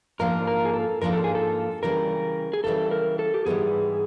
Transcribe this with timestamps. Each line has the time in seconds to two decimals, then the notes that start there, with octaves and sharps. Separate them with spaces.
0.19 G#2 F3 A#3 D4 F4 A#4
0.47 A#4
0.65 G#4
0.74 A4
1.01 G#2 F3 A#3 D4 F4 A#4
1.13 A4
1.24 G#4
1.35 A4
1.83 C#3 E3 G3 A#4
2.53 G#4
2.64 C#3 E3 G3 A4
2.91 A#4
3.19 A4
3.34 G4
3.46 G#2 E3 G3 B3 G#4